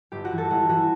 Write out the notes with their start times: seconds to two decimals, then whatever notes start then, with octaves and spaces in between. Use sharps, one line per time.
0.12 G1 G4
0.25 F#4
0.31 G2 E3
0.38 A4
0.50 G1 F#4
0.69 E3 F#4